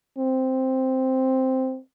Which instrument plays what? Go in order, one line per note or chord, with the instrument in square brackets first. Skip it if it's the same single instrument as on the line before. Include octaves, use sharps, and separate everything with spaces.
[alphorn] C4